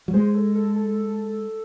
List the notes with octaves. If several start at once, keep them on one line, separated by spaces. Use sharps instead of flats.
F#3
G#3 C5
A4
A4
A4